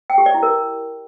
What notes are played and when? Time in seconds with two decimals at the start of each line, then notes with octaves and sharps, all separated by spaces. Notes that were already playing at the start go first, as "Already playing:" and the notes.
0.10 G5
0.18 G4
0.26 D5
0.34 E4
0.43 A#4